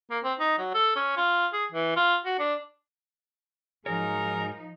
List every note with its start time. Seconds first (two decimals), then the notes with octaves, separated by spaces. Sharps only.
0.11 A#3
0.24 C4
0.39 D#4
0.58 F#3
0.74 A4
0.96 C#4
1.17 F4
1.53 G#4
1.72 E3
1.96 F4
2.25 F#4
2.39 D4
3.86 G#2 F3 F#3 D#4 G#4 A#4 C#5